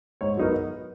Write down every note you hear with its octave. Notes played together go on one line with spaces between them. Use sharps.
G#2 C#5
F#3 B3 D#4 A#4